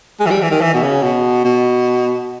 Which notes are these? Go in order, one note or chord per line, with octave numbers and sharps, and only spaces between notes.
G#3
E3
G3
E3
D#3
E3
B2
C#3
B2
B2